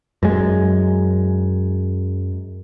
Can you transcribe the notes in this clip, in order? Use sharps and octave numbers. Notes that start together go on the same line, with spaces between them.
F#2 G#3